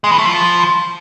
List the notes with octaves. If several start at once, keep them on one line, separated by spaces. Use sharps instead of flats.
G#3
E3
A3
F3